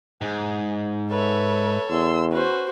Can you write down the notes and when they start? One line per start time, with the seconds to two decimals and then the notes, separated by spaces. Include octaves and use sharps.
0.21 G#2 G#4
1.10 A4 B4 C#5 E5
1.89 E2 C6 E6
2.32 C#4 F#4 B4 C5